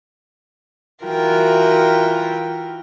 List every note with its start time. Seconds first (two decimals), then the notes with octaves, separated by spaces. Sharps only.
1.05 E3 F4 F#4 A#4 G5